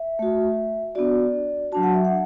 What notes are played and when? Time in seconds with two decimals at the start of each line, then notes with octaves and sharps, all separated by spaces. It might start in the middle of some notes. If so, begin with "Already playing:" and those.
Already playing: E5
0.19 A3 F#4
0.95 B3 D4 F#4 D5
1.72 F#3 D4 F#4 A5
1.83 F#5
1.94 E5
2.05 F#5